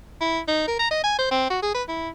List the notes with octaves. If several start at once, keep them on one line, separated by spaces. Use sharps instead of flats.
E4
D#4
A#4
A#5
D#5
G#5
C5
C4
F#4
G#4
B4
E4